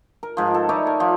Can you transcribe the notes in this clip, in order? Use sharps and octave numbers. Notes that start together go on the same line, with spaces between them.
A#4
G#2 F3
A4
D#4 E4 C#5 D5
A#4
F3